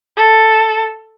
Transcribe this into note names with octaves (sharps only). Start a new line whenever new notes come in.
A4